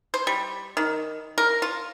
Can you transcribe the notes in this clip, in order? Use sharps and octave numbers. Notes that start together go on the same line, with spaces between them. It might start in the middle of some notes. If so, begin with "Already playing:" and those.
C5
G3
D#3
A#4
F4